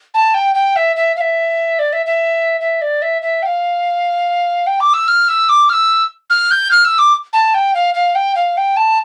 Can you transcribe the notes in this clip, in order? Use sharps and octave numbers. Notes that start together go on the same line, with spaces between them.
A5
G5
G5
E5
E5
F5
E5
D5
E5
E5
E5
D5
E5
E5
G5
F5
G5
D6
E6
F6
E6
D6
F6
E6
F6
G6
F6
E6
D6
A5
G5
F5
F5
G5
F5
G5
A5